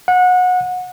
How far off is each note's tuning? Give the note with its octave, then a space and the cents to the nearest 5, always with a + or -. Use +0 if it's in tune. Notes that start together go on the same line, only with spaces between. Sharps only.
F#5 -25